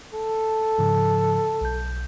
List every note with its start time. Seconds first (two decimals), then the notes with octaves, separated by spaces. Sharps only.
0.14 A4
0.78 G#2 C#3 F3
1.61 B1 G6